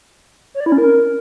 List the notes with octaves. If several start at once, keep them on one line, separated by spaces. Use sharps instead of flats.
C#5
D5
E4
C#4
A#4